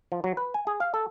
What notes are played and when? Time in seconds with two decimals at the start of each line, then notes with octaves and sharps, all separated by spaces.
0.12 F3
0.24 F#3
0.37 B4
0.54 G#5
0.67 G#4
0.80 F5
0.94 A4